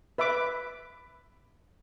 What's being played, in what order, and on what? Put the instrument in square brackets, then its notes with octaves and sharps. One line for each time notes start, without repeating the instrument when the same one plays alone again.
[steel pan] B4 E5 B5 D6